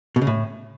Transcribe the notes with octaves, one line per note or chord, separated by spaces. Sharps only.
B2
C#3
A2